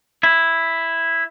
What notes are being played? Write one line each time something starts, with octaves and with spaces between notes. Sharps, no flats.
E4